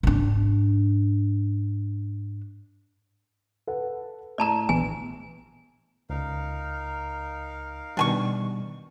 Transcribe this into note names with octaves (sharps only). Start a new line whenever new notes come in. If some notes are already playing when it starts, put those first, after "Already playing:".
G#2 D4
A4 B4 F#5
A2 D5 A5 A#5 E7
A#1 E3 B3 G#5
C#2 D#4 A#4 F5
B2 D#3 G3 D4 G#5 C#6